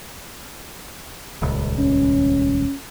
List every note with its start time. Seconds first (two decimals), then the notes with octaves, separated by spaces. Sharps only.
1.42 D#1 C#2
1.79 C#4